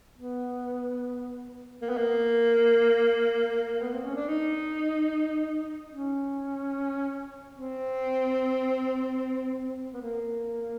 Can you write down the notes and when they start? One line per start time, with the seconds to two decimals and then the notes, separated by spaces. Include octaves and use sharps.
0.18 B3
1.81 A#3
1.89 B3
1.97 A#3
3.81 B3
3.93 C4
4.04 C#4
4.16 D4
4.28 D#4
5.92 C#4
7.56 C4
9.94 B3
10.02 A#3